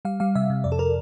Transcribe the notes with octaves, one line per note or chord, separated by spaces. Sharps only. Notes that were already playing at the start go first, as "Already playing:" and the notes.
G3 F5
G3 F5
C3 E5
C3
F2 D5
A4
A#4